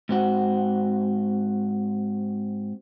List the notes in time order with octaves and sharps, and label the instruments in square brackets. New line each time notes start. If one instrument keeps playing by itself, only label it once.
[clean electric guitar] G#2 C4 F#4